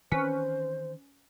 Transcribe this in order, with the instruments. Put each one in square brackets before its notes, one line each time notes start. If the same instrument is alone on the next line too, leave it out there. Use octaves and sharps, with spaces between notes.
[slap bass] D#3 E3 C4 [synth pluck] C#4 B4 [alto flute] C5